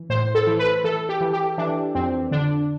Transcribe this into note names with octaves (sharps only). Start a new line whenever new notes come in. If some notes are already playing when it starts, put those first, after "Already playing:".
Already playing: E3
A2 C5
A4
E3
B4
E3 A4
G4
E3
G4
E3 D4
F2 C4
D3 D4